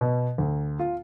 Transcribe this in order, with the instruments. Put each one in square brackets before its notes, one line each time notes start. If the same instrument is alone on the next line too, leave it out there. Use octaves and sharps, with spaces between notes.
[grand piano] B2
D2
F4